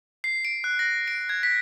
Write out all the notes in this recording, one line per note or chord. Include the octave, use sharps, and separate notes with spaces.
C7
D7
F#6
A#6
D7
G#6
B6